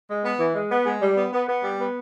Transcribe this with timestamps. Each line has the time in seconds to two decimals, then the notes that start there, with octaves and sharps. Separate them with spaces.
0.09 G#3
0.24 B3
0.39 E3
0.55 G#3
0.71 B3
0.86 G#3
1.01 G3
1.17 B3
1.32 B3
1.48 B3
1.63 G3
1.79 B3